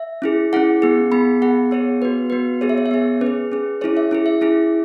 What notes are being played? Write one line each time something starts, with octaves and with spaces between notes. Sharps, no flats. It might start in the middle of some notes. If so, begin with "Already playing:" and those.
Already playing: E5
C#4 E4 G#4
C#4 E4 G#4 F#5
B3 G#4
B3 G#4 B5
B3 G#4 F#5
B3 G#4 C#5
B3 F#4 B4
B3 F#4 B4
B3 G#4 C#5
E5
C#5
E5
B3 G#4 C#5
C#4 B4
G#4
C#4 G#4
C#4 E4 G#4 C#5
E5
C#4 E4 G#4
E5
C#4 E4 G#4